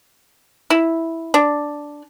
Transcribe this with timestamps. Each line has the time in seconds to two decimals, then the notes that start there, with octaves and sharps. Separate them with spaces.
0.70 E4
1.34 D4